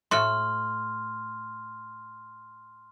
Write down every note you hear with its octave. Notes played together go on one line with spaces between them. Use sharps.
A2 A3 F#4 C6 F6